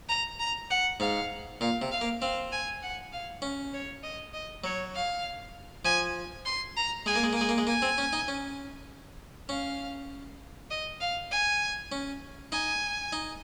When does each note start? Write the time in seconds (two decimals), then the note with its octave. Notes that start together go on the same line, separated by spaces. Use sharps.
0.09 A#5
0.39 A#5
0.70 F#5
1.00 G#2 F5
1.61 A#2 F5
1.82 C3
1.91 F5
2.01 A#3
2.21 C4 F5
2.52 G#5
2.82 F#5
3.12 F5
3.42 C#4
3.73 C#5
4.03 D#5
4.33 D#5
4.64 F#3 C#5
4.95 F5
5.85 F3 G#5
6.45 C6
6.77 A#5
7.06 G#3 G#5
7.16 A#3
7.24 G#3
7.33 A#3
7.36 G#5
7.41 G#3
7.49 A#3
7.58 G#3
7.67 A#3 G#5
7.82 C4
7.98 C#4
8.13 D#4
8.28 C#4
9.49 C#4 F5
10.70 D#5
11.01 F5
11.31 G#5
11.92 C#4
12.52 D#4 G#5
13.13 D#4